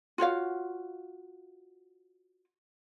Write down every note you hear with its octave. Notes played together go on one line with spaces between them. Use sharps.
F4 F#4 C#5 F5